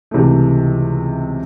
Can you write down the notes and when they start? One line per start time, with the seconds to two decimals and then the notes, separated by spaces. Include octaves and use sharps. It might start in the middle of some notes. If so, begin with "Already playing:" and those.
0.11 C#2 C3 E3 A3